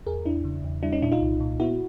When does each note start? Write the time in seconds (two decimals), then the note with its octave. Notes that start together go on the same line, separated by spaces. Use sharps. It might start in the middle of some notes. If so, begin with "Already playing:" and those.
0.06 E2 G#4 A#4
0.25 E2 D4 E4
0.45 C#3
0.64 E2
0.83 G3 D4 E4
0.92 C#4 D#4
1.02 A#2 D4 E4
1.12 D#4 F4
1.21 C2
1.40 A#2
1.60 B3 E4 F#4